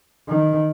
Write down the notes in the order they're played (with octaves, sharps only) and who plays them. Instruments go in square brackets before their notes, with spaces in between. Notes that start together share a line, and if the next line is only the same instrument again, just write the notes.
[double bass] D#3